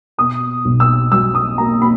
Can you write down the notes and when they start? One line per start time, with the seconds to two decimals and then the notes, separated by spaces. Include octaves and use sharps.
0.18 B2 D#6
0.65 B1
0.80 E6
1.12 F#3 E6
1.35 D#6
1.58 A#3 A#5
1.82 B5